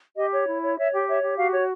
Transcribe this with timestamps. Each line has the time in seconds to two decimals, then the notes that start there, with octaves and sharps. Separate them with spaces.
0.17 G4 D#5
0.32 C#5
0.47 E4
0.62 C#5
0.77 C#5 E5
0.93 G4
1.07 C#5 E5
1.23 G4
1.37 F#4 F5
1.53 C#5